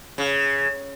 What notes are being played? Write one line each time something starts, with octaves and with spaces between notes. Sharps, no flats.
C#3